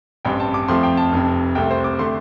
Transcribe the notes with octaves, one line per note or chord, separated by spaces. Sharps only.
A1 G2 G3 C4 G5
A5
D6
F2 F3 A3 C4 C6
G5
A5
F1 F2 C3
C2 C3 A3 C4 G5
C5
D6
D3 A3 C4 C6